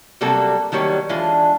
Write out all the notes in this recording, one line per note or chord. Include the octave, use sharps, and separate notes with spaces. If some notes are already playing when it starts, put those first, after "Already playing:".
C3 F#3 G3 A#3 F#4 A4
D#3 F#3 G3 A#3 G4 C#5
E3 G#3 D4 F4